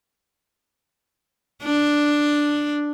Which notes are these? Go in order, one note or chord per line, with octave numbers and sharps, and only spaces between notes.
D4